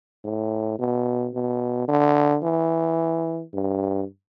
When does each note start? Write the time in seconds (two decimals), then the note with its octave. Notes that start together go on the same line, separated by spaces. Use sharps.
0.25 A2
0.79 B2
1.34 B2
1.88 D3
2.44 E3
3.54 G2